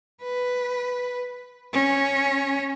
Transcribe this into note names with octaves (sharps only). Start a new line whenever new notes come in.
B4
C#4